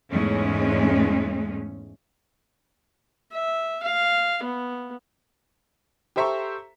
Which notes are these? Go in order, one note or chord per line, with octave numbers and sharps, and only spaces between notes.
E2 G#2 G#3 A3 C#4
E5
F5
B3
G4 A4 C5 E5 A#5 C#6